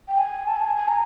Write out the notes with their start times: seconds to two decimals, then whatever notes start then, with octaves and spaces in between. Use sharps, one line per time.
0.08 G5
0.18 G#5
0.48 A5
0.56 G#5
0.76 G#5
0.88 A#5